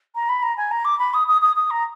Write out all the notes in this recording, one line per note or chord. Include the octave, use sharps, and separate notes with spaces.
A#5
B5
A#5
G#5
A#5
D6
B5
D#6
D#6
D#6
D#6
A#5